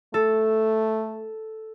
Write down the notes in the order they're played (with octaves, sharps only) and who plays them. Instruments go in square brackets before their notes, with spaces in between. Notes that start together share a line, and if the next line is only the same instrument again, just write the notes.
[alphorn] A3 [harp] A4